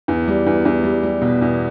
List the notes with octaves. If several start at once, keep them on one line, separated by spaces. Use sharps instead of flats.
E2
G3
E2
E2
G3
G3
B2
E2